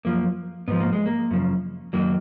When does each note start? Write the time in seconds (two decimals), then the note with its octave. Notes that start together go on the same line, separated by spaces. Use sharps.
0.05 F#2 F3 A#3
0.68 G#2 F3 B3
0.81 A#3
0.93 G#3
1.06 A#3
1.31 F#2 C#3 F3
1.93 F#2 D#3 F#3 A#3